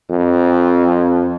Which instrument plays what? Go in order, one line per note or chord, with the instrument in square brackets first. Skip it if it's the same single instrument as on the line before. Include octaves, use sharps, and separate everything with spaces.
[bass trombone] F2